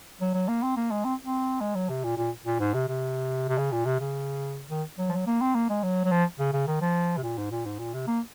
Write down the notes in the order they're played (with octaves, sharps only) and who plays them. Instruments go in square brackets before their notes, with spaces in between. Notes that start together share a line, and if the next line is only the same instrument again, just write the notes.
[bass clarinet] F#3
F#3
A#3
C4
A#3
G#3
C4
C4
G#3
F#3
C3
A#2
A#2
A#2
G#2
C3
C3
C3
C#3
A#2
C3
C#3
D#3
F#3
F3
F#3
A#3
C4
A#3
G#3
F#3
F#3
F3
C#3
C#3
D#3
F3
C3
A#2
G#2
A#2
G#2
A#2
C3
A#3